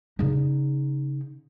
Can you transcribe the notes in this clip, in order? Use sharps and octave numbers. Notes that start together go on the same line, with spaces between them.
C#3 D#4